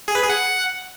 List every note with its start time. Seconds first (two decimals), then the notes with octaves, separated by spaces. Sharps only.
0.08 G#4
0.15 B4
0.22 G#4
0.30 F#5